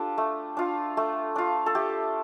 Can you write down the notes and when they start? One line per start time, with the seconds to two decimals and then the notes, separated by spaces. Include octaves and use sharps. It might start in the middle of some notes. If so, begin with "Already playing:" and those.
Already playing: D4 F4 G4 A4
0.18 A3
0.57 D4 F4
0.97 A3
1.36 D4 F4
1.66 A4
1.75 A3 G4